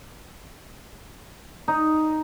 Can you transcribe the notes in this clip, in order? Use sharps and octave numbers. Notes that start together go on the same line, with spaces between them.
D#4